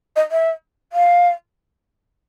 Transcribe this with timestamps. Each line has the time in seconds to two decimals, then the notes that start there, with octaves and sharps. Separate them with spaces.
0.16 D#5
0.31 E5
0.93 F5